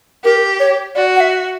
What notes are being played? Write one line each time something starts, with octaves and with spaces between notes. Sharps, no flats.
G4 A#4
C#5
F#4 D5
F#5
E5